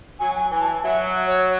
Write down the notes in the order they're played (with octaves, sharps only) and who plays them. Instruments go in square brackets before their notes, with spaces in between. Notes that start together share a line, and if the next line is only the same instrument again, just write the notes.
[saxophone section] F#3 [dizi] G#5
[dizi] G#5
[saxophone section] E3 [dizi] G#5
[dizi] A5
G#5
[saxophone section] F#3 [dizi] E5
[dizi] C#5